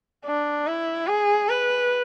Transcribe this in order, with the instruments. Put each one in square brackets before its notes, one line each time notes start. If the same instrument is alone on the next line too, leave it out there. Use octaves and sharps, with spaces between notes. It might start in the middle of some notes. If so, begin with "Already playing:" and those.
[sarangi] D4
E4
G#4
B4